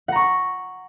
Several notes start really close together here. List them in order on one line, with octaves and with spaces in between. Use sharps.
F#5 A#5 C#6